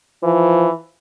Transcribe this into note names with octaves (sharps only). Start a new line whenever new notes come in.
E3 F3